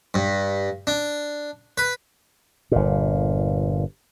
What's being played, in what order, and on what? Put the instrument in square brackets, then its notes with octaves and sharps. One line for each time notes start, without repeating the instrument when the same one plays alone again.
[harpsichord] G2
D4
B4
[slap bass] G1 A#2